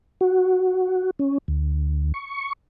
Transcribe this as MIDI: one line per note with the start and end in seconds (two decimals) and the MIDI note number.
0.21 1.10 66
1.19 1.38 61
1.48 2.12 38
2.14 2.53 85